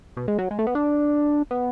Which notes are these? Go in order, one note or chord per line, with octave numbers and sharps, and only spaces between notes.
B2
G#3
F#3
G#3
A3
B3
D4
B3